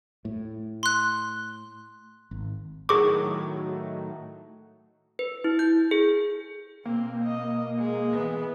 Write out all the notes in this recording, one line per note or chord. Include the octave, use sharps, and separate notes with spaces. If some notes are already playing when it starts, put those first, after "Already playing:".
A2
C6 F#6
G#1
A2 D#3 F#3 G#4 C#6 D6
B4
E4
G6
G#4
B2 A#3 C4
D#5
G#3
E3 B3